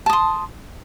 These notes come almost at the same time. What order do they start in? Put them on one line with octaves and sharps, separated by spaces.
A5 D#6 C6